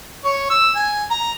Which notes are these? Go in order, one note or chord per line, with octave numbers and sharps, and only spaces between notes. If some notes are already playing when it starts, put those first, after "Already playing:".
C#5
E6
G#5
A#5